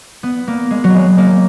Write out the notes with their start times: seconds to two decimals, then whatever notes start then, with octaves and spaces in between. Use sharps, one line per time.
0.23 B3
0.48 A#3
0.71 G#3
0.84 F#3
0.94 G#3
1.18 A#3